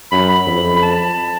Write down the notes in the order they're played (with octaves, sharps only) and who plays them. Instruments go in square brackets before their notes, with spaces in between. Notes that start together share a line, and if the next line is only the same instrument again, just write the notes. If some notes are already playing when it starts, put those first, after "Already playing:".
[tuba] F#2 [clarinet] B5
[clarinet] B5
[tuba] F2
[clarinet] B5
A5